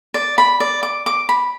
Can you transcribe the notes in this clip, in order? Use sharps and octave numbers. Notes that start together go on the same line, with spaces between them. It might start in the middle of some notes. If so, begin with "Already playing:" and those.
D5
B5
D5
D6
D6
B5